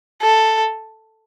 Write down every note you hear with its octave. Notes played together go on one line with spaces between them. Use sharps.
A4